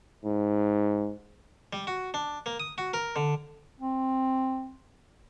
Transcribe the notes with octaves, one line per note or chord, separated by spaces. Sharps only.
G#2
G3
F#4
D4
A#3
D#6
F#4
A#4
D3
C4